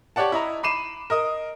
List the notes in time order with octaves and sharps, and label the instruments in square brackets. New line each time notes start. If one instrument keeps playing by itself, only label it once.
[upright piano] G4 C#5 D5 F#5 A5
E4 D#5 A#5
B5 D6 C7 D#7 E7
A#4 D#5 D#6